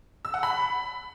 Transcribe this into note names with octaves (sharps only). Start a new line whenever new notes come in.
E6
F#5
B5